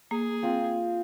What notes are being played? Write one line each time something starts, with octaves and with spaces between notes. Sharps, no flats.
A#3 G#4
C4 F4 F5